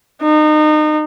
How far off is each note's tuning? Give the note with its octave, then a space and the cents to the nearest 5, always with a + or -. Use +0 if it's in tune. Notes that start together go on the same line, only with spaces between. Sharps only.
D#4 -30